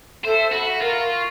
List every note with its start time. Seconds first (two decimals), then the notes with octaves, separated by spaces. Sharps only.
0.25 A4 C5 E5
0.52 F#4 B5
0.82 F4 A#4
1.02 C#6